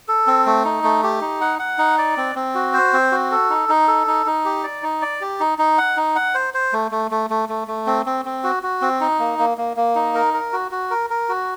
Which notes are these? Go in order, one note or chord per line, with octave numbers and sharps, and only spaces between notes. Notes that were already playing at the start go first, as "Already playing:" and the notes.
A4
C4
A3
D#4
A3
G4
D#4
F#5
F#5
D#4
D5
C4
C4
F#4
C5
C4
F#4
A4
D#4
D#4
A4
D#4
D#4
G4
D5
D#4
D5
G4
D#4
D#4
F#5
D#4
F#5
C5
C5
A3
A3
A3
A3
A3
A3
C4
C4
C4
F#4
F#4
C4
D#4
A#3
A#3
A#3
A#3
D#4
A#4
A#4
F#4
F#4
A#4
A#4
F#4